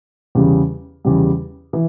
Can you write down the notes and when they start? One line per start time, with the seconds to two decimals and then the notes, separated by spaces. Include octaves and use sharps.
0.35 E2 C#3 G3
1.05 E2 C#3 G3
1.73 E3